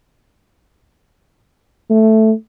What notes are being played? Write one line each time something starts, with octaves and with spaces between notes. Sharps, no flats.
A3